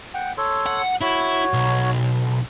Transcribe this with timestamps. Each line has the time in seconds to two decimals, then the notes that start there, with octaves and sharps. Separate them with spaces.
0.14 F#5 G5
0.38 A4 C#5 C6
0.66 F#5
1.01 E4 F#4 C#5
1.54 B1